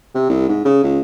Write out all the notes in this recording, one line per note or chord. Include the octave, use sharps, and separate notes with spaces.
C3
C2
G#2
C#3
C#2